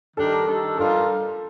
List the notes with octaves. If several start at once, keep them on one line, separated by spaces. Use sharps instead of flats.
D#3 G3 D4 G4 A4 A#4
D#3 G3 D4 A4
G3 D4 F4 A4 A#4